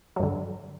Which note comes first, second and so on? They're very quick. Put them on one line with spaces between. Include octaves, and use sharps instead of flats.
F#3 G2 D3